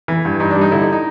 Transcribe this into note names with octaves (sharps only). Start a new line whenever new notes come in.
E3
G2
G2 D#4
G3 D4
D#4
D3 E4
D#4
D#4